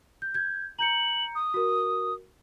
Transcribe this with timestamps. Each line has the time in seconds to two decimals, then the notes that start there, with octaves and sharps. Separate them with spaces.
0.22 G6
0.34 G6 G#6
0.79 A#5 G6 C#7 F#7
1.35 D#6
1.54 F#4 A#4